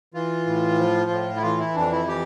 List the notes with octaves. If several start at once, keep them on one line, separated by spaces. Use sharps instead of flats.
E3 F4
A2
F3
A2
E4
E3 F4
E4
F2 D4
E4
E3 G4